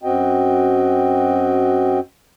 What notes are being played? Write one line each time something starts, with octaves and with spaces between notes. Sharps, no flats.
F#2 C4 F#4 D#5 G5